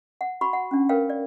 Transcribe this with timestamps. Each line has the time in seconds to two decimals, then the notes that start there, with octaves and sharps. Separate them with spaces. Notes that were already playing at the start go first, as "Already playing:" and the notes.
0.21 F#5
0.41 F#4 B5 C#6
0.53 F#5
0.71 C#4 D4
0.89 A#4 B4 C#5 F5 G5
1.10 D5